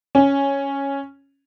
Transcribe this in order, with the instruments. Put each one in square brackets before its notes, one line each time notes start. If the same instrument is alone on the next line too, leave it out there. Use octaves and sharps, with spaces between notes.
[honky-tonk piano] C#4